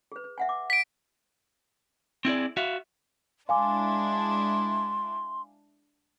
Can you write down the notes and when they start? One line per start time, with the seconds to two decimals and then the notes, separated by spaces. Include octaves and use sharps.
0.12 G#4 B4
0.24 B4
0.38 E5 F#5 G#5
0.49 D6
0.70 B6 D7
2.25 C4 E4 G#4 D5
2.57 F#4 E5 F5
3.49 G#3 D4 E4 F5 G#5 C6 D6